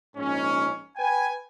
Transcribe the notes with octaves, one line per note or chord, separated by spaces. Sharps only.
A#1 G#2 C#4
B4 G5 G#5